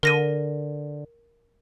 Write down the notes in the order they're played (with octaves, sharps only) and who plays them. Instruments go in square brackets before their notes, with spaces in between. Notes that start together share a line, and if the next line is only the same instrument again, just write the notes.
[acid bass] D3 [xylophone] A#4 A#6 D#7